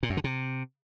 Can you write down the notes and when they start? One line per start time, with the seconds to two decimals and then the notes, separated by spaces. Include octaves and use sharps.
0.03 A#2
0.10 F#2
0.17 D3
0.24 C3